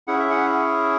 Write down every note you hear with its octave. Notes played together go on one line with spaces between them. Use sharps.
C#4 E4 G#4 F#5
E5
F#5